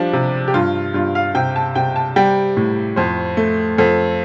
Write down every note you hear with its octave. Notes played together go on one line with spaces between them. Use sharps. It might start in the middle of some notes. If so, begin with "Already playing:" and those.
Already playing: F3 G3 D4
C3
G4
G2 F4
G2 F4
F5
C3 G5
A5
C3 G5
A5
G3 G5
A2
F2 C5
A3
F2 A4